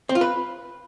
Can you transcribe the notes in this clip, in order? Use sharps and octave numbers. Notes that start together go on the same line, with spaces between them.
C4
F4
B4